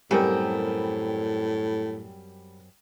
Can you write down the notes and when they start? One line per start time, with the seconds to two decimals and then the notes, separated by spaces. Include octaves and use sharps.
0.11 F#2 A2 G3 C4 A#4